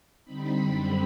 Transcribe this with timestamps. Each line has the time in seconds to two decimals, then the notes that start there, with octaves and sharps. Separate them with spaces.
0.24 D3 G3 C4 D#4 B5
0.57 F#2 D3 G3 C4 B5